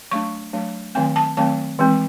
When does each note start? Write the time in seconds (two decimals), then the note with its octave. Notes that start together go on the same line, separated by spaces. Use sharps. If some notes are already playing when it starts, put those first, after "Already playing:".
0.11 F#3 A3 D4 C#6
0.53 F#3 A3 D4
0.95 D#3 F#3 A3 C4 G#5
1.16 A5
1.37 D#3 F#3 A3 C4 A5
1.79 E3 G#3 C4